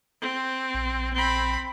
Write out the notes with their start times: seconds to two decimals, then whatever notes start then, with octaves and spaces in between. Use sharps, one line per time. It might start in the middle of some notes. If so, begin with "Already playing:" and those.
0.22 C4
0.74 A#1
1.13 C4 B5